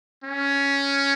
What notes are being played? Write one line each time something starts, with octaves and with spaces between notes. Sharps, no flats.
C#4